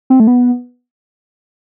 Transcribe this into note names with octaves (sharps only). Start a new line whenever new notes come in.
C4
A3
B3